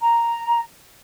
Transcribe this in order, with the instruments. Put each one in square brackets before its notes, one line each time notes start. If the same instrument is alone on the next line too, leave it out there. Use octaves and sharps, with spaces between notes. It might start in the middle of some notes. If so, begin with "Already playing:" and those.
[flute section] A#5